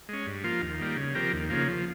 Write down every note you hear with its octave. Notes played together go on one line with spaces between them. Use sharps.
G#3 C#4
G2
F3 A#3 F4
D#2
D#3 G3 A#3
C#3
F3 C4 G4 A#4
D#2
C#3 F3 A#3
F3